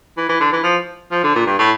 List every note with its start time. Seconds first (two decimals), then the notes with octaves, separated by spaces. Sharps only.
0.17 E3
0.29 E3
0.40 D3
0.52 E3
0.63 F3
1.12 F3
1.24 D3
1.35 A#2
1.46 G2
1.59 A2